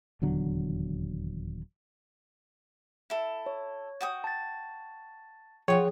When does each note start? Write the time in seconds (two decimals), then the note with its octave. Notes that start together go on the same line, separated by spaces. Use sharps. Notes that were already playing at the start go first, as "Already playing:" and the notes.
0.22 D#1 E2 D3 F#3
3.10 E4 A4
3.46 C#5
4.01 F#4 G5 D#6
4.24 A5 A6
5.68 F3 F4 G#4 C#5 F#5 G5